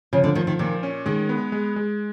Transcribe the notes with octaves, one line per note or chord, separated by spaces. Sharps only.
C#3 F3
D3
D#3 F3
D#3
A#2 D#3
C#4
D#3 G#3
B3
G#3
G#3